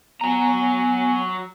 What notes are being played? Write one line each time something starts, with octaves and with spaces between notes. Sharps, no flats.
F#3 B3 G#5 A#5